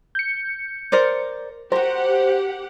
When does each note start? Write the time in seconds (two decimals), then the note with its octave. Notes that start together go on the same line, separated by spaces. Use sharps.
0.15 G6 C#7
0.92 A#4 C5 D5
1.72 F#4 G4 A#4 C5 F#5